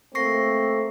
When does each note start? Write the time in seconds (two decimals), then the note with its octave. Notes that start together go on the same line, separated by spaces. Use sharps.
0.15 A3 A#3 C4 C#6 A#6 C7